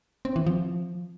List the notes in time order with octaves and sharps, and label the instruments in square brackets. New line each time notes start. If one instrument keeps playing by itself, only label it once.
[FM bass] C4
E3
F3